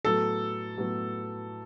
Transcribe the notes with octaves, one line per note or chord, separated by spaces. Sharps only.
A2 F#3 B3 A4
A2 F#3 B3